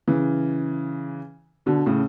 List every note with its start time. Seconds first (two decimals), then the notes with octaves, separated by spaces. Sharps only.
0.08 C#3 E3
1.66 B2 D3
1.86 A2 C#3